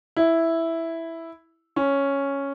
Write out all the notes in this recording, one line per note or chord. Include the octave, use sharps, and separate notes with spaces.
E4
C#4